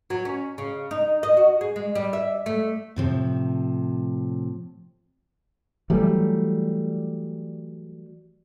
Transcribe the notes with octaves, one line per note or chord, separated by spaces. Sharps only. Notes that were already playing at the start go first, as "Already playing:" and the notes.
F#3
C#4
C#3
D#4
D#5
F#4
G#4
G#3
G3
E5
A3
A2 C3 F3
E3 F#3 G3 A3